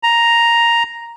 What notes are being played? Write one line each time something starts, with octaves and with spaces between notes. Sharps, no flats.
A#5